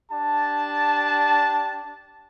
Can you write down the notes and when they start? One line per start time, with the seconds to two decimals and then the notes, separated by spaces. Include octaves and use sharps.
0.11 D4 G4 A5